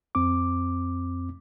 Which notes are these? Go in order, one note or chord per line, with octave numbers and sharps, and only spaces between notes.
F2 C4 D6